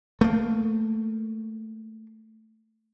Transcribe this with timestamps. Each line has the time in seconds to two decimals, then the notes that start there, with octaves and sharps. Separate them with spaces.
0.21 A3 A#3